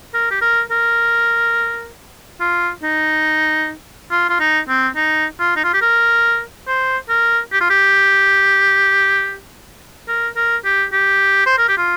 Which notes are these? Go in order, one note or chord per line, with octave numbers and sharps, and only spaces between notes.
A#4
G4
A#4
A#4
F4
D#4
F4
F4
D#4
C4
D#4
F4
D#4
F4
G4
A#4
C5
A#4
G4
F4
G4
A#4
A#4
G4
G4
C5
A#4
G4
F4